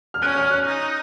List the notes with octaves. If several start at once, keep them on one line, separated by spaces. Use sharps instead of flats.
F6
C#4 F#6
F6
F#6
D#4